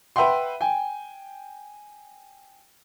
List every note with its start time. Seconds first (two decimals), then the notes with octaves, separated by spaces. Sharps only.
0.16 B4 E5 F#5 G5 C6
0.61 G5 G#5